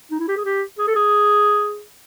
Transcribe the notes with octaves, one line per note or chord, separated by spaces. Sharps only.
D#4
E4
G4
G#4
G4
G#4
A4
G#4